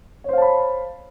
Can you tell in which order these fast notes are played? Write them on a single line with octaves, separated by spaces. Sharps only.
C#5 C5 F5 A5 B5